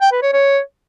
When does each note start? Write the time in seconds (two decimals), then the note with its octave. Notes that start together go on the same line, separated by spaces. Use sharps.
0.01 G5
0.12 B4
0.22 C#5
0.33 C#5